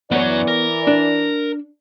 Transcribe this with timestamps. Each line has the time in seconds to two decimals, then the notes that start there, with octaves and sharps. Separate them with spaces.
0.11 F#2 E3 F#3 B3 C#5 D5
0.48 A#4
0.87 D4